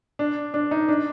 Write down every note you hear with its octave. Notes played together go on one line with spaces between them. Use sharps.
D4
D4
D#4
D4